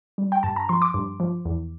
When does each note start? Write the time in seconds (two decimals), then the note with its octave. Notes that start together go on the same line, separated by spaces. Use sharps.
0.18 G3
0.32 G5
0.43 G2 A5
0.56 A#5
0.69 F3 C6
0.82 D6
0.94 G2
1.20 F3
1.45 E2